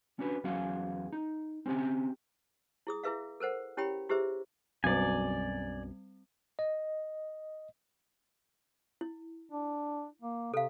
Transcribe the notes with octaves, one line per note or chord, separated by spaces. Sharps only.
C#4 D4 F#4 B4
E2 F#3 C#4 F#4 G#4 F5
D#4
C4 C#4 F4 G4 G5
E4 G#4 D#6
E4 G#4 B4 E5 F5
A4 A#4 C5 F#5
C#4 E4 G4 C#5 G5 B5
E4 G4 G#4 B4 C5 E5
B1 F#2 B2 G3 C4 D5 G#5
D#5
E4
D4
A#3
C3 A4 F5